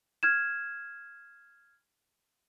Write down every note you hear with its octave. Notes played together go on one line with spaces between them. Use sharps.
F6 G#6 E7